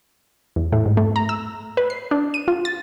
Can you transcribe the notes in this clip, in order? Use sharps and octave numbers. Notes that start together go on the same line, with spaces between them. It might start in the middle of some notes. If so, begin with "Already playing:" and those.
E2
A2
G#2
A3
A#5
E6
B4
C7
D4
D#7
F4
A6